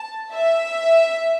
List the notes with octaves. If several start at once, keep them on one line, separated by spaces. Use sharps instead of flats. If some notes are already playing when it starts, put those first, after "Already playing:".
Already playing: A5
E5